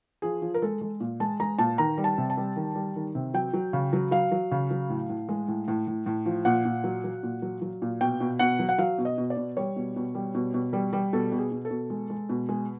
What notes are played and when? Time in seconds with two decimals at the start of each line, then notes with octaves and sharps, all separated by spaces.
0.22 F3 G#4
0.42 F3
0.54 A#4
0.62 G#3 A4
0.81 G#3
1.00 A#2
1.20 G#3 A5
1.40 G#3 A#5
1.58 A#2 A5
1.78 D#3 A#5
1.98 G3
2.04 A5
2.18 C3
2.30 A5
2.37 G3
2.56 D#3
2.75 G3
2.96 D#3
3.15 C3
3.34 F#3 G5
3.54 F#3
3.73 C#3
3.93 F#3
4.11 F#3 F5
4.32 F#3
4.51 C#3
4.71 F#3
4.90 A2
5.09 A2
5.29 G#3
5.48 A2
5.68 A2
5.87 A2
6.06 A2
6.26 F3
6.45 A#2 F#5
6.65 A#2
6.84 F#3
7.04 F#3
7.23 A#2
7.42 F#3
7.62 F#3
7.82 A#2
8.01 B2 G5
8.20 B2
8.39 B2 F#5
8.59 F#3
8.69 F#5
8.78 F#3 F5
8.98 B2
9.05 D#5
9.18 B2
9.30 D5
9.37 B2
9.57 G3 C#5
9.76 B2
9.96 B2
10.15 G3
10.35 B2
10.54 B2
10.73 G3
10.93 G3
11.13 B2 A4
11.32 B2
11.38 G#4
11.51 B2
11.65 A4
11.70 B2
11.90 G#3
12.10 G#3
12.29 B2
12.49 G#3